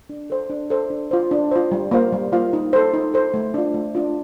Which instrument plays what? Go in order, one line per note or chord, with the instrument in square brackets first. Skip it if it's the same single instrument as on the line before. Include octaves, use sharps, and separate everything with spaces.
[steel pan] D4
A4 C5
D4
A4 C5
D4
F4 C5
D4
F4 C5
G3
A#3 F4 C5 F5
G3
A#3 F4 C5 F5
D#4
A4 C5
D#4
A4 C5
A3
D4 F4
A3
D4 F4